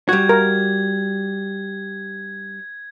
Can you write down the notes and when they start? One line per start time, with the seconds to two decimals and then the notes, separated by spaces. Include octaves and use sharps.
0.09 G3 F#4 G#6
0.29 A#4